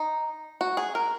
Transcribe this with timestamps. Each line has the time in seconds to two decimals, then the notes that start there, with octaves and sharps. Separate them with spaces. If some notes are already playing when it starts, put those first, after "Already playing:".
Already playing: D#4
0.61 F#4
0.77 G#4
0.95 A#4